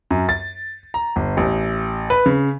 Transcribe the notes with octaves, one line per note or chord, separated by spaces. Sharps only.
F#2
A6
A#5
G1
A1
B4
C#3